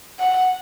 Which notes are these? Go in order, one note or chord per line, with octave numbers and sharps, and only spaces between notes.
F#5